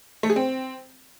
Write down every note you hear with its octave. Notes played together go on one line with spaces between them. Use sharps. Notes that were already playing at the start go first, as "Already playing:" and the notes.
A3
G#4
C4